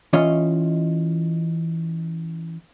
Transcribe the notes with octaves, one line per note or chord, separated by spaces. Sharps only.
E3 C#4 F4 C#5 D#5